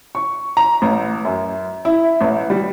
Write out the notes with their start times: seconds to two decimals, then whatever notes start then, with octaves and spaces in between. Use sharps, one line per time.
0.15 C#6
0.57 A#5
0.82 A1
1.25 F#2
1.85 E4
2.21 A1
2.50 G3